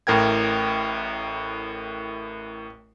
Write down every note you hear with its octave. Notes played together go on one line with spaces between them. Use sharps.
A1 A2 A#4 G5 G#6